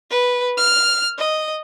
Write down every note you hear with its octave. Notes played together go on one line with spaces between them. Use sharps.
B4
F6
D#5